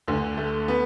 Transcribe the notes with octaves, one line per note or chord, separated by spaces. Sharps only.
D2 D3
A3
B3